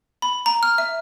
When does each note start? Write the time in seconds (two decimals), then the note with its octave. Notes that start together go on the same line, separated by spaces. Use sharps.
0.22 B5
0.46 A#5
0.63 F6
0.78 E5